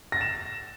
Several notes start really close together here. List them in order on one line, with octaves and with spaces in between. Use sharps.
A#6 A6 E7